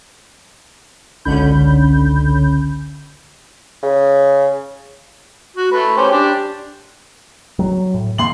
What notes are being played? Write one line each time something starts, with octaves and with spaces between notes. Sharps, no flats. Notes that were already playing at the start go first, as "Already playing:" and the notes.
G#1 C#2 D3 C#4 B5 G6
C#3
F#4
A3 B4
C#4 G4 C5
D4 G4
F#3
A2
D#3 A#3 C6 F#7